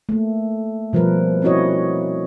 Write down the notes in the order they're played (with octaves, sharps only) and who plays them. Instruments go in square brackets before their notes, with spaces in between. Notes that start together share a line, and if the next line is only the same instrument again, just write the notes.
[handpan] A3 A#3
B2 F3 G3 A#4 B4
C4 C#4 E4 F#4 C#5 D#5